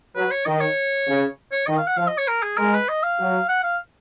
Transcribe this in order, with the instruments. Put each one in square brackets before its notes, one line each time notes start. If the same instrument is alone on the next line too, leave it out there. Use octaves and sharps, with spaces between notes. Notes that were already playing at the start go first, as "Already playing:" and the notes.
[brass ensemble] F#3 [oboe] B4
[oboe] C#5
[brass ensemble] D#3 [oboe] D#5
[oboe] C#5
[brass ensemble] C#3
[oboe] C#5
[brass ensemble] D#3 [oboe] D#5
[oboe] F5
F#5
[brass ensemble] F3 [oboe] F5
[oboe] D#5
C#5
A#4
G#4
[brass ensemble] G#3 [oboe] A#4
[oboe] B4
D#5
F5
[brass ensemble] F#3
[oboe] F#5
F5